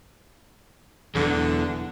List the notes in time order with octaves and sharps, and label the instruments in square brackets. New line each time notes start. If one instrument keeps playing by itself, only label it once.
[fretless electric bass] E1 F#3 D4 [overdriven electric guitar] E2 [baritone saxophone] D3